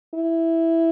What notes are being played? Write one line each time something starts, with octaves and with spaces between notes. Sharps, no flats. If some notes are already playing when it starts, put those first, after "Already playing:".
E4